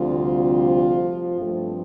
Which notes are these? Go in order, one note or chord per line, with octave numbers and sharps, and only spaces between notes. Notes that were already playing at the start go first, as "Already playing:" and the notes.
Already playing: D2 C3 F3 G3 C4 F4
G2 F3 A3 C4